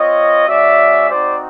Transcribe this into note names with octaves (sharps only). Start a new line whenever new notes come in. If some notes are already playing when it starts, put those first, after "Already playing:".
Already playing: C4 F4 C#5 D#5
G#3 C#4 F#4 D5 E5
C4 D#4 F#4 C5 D5